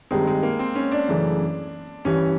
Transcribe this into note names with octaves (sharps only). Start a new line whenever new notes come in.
G2 D#3 G3 G#3 C4 D#4
G#3
A#3
C4
C#4
D4
F#2 C#3 E3 A3
G2 E3 G3 C#4